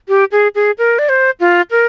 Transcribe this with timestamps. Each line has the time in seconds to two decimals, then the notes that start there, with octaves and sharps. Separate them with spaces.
0.08 G4
0.32 G#4
0.55 G#4
0.78 A#4
0.99 D5
1.09 C5
1.40 F4
1.71 A#4